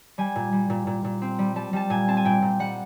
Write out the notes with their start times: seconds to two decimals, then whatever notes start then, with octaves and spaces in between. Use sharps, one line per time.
0.18 G3 G#5
0.36 A#2
0.53 G3
0.70 A#2
0.87 A#2
1.04 A#2
1.22 C4
1.39 G3
1.56 G3 A5
1.73 G3 A5
1.90 A#2 G#5
2.08 C4 A5
2.17 G#5
2.25 A#2 G5
2.42 A#2
2.59 G3 F#5